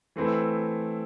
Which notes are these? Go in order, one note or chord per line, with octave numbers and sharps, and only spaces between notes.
E3 A3 C4 E4